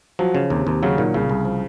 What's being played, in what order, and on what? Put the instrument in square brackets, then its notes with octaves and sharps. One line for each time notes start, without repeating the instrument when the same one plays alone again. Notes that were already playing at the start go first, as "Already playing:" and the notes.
[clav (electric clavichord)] F3 [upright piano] F#3
[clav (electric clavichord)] C#3
[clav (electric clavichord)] D#2 [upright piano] C3
[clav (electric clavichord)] D#2 [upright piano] C3
[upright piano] C#3 [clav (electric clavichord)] F#3
[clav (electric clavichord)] A#2 [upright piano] D#3
[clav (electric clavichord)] C2 [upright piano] C#3
[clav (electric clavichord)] C2
F3